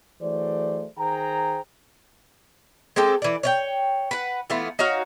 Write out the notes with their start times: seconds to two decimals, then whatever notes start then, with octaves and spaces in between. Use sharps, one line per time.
0.21 E3 F#3 A3 G#4 C5 D5
0.98 D#3 G#4 C5 G5 A#5
2.96 G#3 C4 G4 A4
3.22 E3 D5
3.43 C#5 D5 G5
4.11 B4 F#5
4.50 E3 A3 B3 F4
4.79 D#4 F#4 C#5 F5